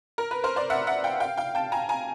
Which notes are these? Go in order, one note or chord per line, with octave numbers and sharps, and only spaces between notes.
A#4
B4
A#4 C5
C5 D5
E5 F#5
E5 F#5
F5 G5
F5 G5
F5 G5
G5 A5
G#5 A#5
G#5 A#5